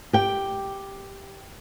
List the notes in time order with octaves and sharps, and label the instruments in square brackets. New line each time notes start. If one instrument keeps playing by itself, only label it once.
[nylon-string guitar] G4 G5